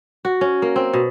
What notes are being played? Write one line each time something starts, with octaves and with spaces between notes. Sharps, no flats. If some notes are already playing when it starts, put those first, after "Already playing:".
F#4
C#4
A#3
C4
B2